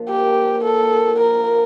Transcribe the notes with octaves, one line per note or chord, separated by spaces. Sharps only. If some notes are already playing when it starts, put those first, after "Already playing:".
Already playing: A#2 F3 D4
A#3 G4
D4
A#3
D4 A4
A#3
A#2
F3 A#4
A#3